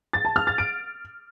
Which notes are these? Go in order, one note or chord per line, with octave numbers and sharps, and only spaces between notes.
A6
A5
F6
A6
D7